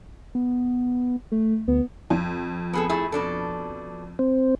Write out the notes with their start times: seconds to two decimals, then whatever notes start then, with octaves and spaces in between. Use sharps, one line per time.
0.35 B3
1.32 A3
1.68 D2 B3
2.10 F2
2.73 B3 G#4 A4
2.89 A3 E4 G#4
3.12 B2 D4 A4
4.19 C4